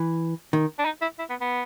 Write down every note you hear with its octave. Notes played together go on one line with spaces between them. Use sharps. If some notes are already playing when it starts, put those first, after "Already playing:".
Already playing: E3
D#3
D4
D#4
E4
E4
B3
B3